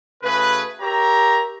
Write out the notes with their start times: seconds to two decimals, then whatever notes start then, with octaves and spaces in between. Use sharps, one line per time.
0.23 C#3 A3 F#4 G#4 B4
0.81 G4 A#4 C#5 E5 A#5